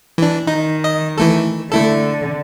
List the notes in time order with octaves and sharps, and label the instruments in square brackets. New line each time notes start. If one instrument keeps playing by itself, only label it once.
[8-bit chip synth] E3 D4
[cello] D#3 [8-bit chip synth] D#4
[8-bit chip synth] D#5
E3 A3 A4
[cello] D3 [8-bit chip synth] A3 E4 A4